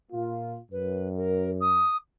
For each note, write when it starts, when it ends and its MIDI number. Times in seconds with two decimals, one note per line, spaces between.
0.12 0.57 46
0.12 0.57 58
0.12 0.57 65
0.72 1.84 42
0.72 1.08 71
1.16 1.51 70
1.60 1.96 87